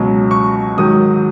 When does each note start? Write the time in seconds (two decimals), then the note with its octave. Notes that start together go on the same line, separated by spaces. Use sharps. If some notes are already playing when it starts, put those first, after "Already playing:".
Already playing: C#2 B2 F#3
0.31 C#6
0.77 G#2 D#3 F#3 D#6